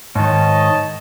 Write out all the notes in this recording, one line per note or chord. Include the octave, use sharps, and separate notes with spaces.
G#2 D#3 C#5 D#5 A5